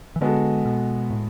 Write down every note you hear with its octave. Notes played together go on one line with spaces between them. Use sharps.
E3
D3 G#3 B3 F#4 A4
B2
A2